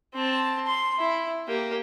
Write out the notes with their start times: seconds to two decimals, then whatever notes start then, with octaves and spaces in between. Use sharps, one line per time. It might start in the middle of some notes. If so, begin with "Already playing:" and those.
0.14 C4 A5
0.67 C6
0.99 E4
1.48 A#3 G4